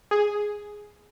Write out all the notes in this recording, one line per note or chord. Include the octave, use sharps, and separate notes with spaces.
G#4